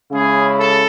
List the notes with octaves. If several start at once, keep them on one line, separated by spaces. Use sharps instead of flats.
C#3 G#3 C#4 E4 G#4
A4